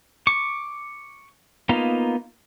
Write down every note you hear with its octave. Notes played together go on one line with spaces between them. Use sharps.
C#6 D6
A#3 B3 D#4 F4